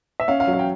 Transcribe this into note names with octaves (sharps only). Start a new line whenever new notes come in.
E5
C#4 F5
F5
F#3
F5
G5